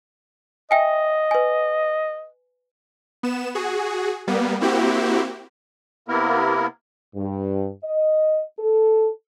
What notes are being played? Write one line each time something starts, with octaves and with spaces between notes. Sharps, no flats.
D#5 E5 G5 G#5
B4 G#5
B3 E7
F#4 G#4
G3 A#3 B3
A#3 C4 E4 F#4 G4
C3 A#3 B3 E4 A#4
G2
D#5
A4